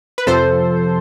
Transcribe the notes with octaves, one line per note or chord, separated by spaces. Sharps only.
B4
F2 C3 F3 A4 C5